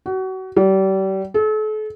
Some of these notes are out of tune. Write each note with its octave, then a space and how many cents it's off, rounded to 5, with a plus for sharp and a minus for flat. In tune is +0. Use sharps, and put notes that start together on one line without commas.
F#4 +30
G3 -35
A4 -40